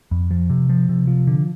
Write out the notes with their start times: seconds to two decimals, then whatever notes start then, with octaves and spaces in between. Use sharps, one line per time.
0.11 F2
0.31 F3
0.50 C3
0.69 F3
0.89 C3
1.07 F3
1.27 D3